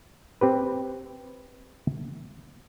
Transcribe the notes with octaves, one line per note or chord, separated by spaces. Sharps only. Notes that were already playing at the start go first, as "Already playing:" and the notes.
C4 G4 B4